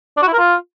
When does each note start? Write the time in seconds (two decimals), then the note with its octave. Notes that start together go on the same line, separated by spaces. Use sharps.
0.17 D4
0.22 F#4
0.28 E4
0.33 A#4
0.38 F4